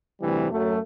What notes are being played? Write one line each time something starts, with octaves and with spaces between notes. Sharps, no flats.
D2 C3 E3 G3
F#2 F#3 A3